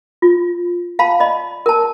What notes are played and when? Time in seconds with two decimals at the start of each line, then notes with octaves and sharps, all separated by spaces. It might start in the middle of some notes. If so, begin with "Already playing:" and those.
0.22 F4
0.99 F5 A5 B5
1.20 D5 D#5 B5
1.66 A#4 A5